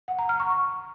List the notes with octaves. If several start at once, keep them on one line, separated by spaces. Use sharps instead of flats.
F#5
A#5
F6
C#6
C#6